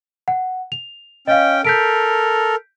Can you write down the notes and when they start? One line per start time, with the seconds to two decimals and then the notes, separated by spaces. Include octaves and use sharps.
0.28 F#5
0.72 F7
1.27 C#4 D#5 F5 G5
1.65 A4 A#4 G6 B6 D7